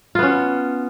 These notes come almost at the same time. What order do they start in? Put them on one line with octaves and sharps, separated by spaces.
F4 B3 C#4